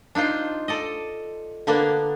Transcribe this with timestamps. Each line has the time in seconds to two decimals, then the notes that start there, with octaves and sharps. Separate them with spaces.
0.15 D4 D#4 F4 C5
0.68 A4 D5 D#5
1.67 D3 A#3 B3 D4